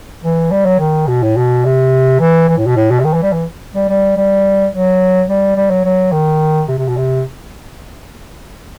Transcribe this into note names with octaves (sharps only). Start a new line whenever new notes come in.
E3
G3
F#3
D#3
B2
A2
B2
C3
E3
E3
A2
B2
A2
B2
C3
D#3
E3
G3
E3
G3
G3
G3
F#3
G3
G3
F#3
F#3
D#3
C3
C3
B2
C3